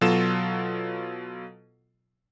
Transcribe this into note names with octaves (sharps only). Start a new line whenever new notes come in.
B2 F#3 F4 A4 E7